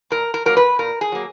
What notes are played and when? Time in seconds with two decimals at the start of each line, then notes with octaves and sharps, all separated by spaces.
0.10 A#2 A#4
0.34 A#4
0.46 F#3 A#3 A#4
0.57 B4
0.79 A#2 A#4
1.01 G#4
1.12 F#3 A#3